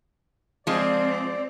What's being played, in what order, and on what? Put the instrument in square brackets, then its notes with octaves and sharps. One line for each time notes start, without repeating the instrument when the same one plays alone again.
[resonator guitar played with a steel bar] F3 G#3 [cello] C4 [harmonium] D5